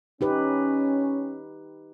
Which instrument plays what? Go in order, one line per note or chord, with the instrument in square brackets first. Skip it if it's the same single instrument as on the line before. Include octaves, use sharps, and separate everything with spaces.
[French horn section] C#4 [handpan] D#4 G4 B4